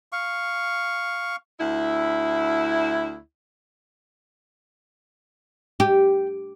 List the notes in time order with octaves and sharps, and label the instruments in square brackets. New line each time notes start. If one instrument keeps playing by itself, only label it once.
[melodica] F5 C#6
[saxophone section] D2 E4
[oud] G4